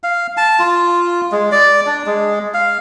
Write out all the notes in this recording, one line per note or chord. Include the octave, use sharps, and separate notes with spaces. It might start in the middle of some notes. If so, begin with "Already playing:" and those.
F5
A5
F4
G#3
D5
D4
G#3
F5